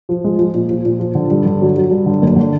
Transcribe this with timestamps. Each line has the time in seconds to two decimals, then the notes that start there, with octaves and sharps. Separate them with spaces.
0.09 F3
0.24 G#3
0.39 F3
0.54 A#2
0.70 F3
0.85 A#2
0.99 F3
1.15 D3
1.31 G2
1.46 D3
1.61 F#3
1.76 F#3
1.91 G2
2.06 D3
2.22 F#1
2.36 D3